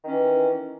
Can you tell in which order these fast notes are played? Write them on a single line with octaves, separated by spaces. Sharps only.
D#3 C#4 E3